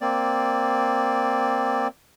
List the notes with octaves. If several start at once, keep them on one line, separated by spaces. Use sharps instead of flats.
A#3 C4 D5